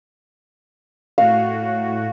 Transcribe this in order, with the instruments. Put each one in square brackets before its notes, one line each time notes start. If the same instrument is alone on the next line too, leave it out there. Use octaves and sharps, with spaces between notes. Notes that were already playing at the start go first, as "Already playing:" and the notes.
[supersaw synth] A2 F#4 [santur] F5